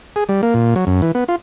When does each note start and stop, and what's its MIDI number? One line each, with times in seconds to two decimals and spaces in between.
0.16 0.24 68
0.29 0.41 55
0.43 0.54 58
0.54 0.74 46
0.76 0.85 54
0.87 1.01 42
1.02 1.12 52
1.15 1.24 59
1.28 1.36 65